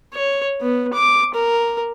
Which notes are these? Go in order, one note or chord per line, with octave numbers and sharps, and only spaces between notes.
C#5
B3
D6
A#4